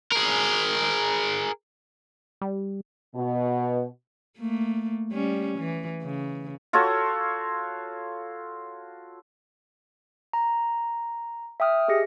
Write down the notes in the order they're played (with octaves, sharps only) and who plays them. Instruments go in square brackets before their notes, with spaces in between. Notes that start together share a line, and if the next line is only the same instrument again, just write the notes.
[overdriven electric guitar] G#4 A#4
[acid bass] G3
[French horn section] B2
[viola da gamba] A3 A#3
G3 C#4
E3
C#3
[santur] F4 F#4 A4 C#5
[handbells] A#5
E5 G5 D#6 F6
G4 G#4 D#5 A#6 C#7